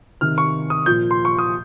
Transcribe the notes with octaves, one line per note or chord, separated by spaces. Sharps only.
C3 D#3 F6
C#6
D#6
A#2 F3 G6
C6
C#6
D#6